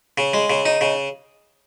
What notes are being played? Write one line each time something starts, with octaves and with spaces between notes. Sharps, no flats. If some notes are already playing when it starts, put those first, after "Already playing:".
C#3
G#3
C#3
D#4
C#3